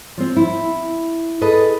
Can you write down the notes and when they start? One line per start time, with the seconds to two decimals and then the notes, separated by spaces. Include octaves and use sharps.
0.18 F3 C4
0.37 E4
1.41 G#4 A4 B4 D#5